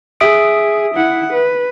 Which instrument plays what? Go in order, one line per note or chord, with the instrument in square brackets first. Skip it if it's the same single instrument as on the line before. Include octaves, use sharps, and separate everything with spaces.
[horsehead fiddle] G#4 [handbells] E5 D#6 D7
[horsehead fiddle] E4 F#5
B4